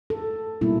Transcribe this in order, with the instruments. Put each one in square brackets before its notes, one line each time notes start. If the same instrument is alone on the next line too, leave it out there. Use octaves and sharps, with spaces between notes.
[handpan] A4
B2 G3 A#3 E4